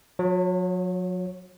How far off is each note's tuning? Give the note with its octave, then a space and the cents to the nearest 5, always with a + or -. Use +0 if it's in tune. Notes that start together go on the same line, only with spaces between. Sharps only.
F#3 -40 C#5 +0